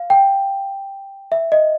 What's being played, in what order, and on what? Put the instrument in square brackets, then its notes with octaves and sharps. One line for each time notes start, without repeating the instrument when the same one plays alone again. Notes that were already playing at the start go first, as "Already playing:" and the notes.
Already playing: [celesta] F5
G5
E5
D#5